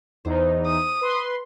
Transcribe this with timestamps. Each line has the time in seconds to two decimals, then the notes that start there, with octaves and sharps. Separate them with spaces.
0.25 E2 D#4 C5
0.67 D#6
1.01 B4 C6